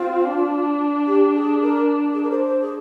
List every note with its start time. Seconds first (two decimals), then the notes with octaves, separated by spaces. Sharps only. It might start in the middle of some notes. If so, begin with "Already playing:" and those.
Already playing: C4 F4
0.25 D4
1.07 G4
1.35 G#4
1.62 A#4
2.14 G#4
2.23 A#4
2.31 C5
2.61 G#4